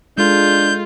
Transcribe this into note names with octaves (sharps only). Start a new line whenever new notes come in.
G#3 D4 F4 A4 G6